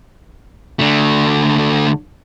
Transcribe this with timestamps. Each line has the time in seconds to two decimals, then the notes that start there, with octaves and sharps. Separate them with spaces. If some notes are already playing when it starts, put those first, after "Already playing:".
0.79 D3 A3